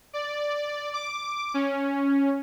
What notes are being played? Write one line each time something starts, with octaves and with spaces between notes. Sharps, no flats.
D5
D6
C#4